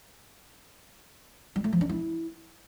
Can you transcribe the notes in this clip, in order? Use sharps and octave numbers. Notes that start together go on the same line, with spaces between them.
G3
A3
F3
D4
E4